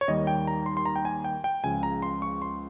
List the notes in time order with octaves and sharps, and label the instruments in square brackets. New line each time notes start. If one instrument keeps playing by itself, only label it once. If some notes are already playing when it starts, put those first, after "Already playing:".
[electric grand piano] C#5
D#2 D#3 G3 D#5
G5
A#5
C6
C6
A#5
G5
G#5
G5
G5
C#2 C#3 F3 G#5
A#5
C6
C#6
C6